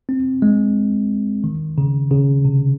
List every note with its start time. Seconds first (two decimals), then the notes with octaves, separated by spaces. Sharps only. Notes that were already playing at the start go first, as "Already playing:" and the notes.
0.09 C4
0.42 G#3
1.44 D#3
1.78 C#3
2.11 C#3
2.45 C3